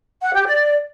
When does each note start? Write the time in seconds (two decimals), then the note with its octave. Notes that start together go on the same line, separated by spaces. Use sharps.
0.21 F#5
0.33 G4
0.45 D5